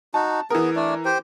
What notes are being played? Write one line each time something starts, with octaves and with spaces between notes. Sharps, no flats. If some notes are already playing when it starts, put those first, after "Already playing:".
D#4 F#4 A5
E3 B3 G#4 A#4
A3 D4 D5
G4 C5 G5